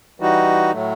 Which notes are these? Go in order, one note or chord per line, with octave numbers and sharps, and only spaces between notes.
E3 G3 D#4 F#4
A2 F#3 A3